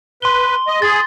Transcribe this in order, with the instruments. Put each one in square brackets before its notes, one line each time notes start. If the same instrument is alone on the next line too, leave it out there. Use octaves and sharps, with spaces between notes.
[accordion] B4 [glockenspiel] C6 G7
[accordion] D#5
[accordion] G#4 [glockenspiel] A6